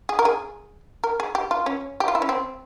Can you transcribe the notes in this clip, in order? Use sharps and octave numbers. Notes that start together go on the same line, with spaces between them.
G#4
A#4
G#4
A#4
G#4
G4
F4
C#4
G4
F4
E4
C#4
C4